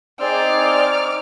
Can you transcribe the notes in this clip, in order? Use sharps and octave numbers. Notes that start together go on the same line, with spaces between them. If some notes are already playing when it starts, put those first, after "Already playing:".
C4 D#4 G#4 D5 D6 F6